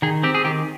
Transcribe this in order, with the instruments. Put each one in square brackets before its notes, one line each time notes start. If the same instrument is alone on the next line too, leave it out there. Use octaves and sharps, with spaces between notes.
[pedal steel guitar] D#3 G#4
C4 G4
G#4
D#3 G4